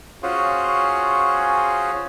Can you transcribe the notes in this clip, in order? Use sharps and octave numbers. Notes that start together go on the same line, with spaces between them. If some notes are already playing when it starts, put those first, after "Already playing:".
C#4 F4 F#4 G#4 C5 C#5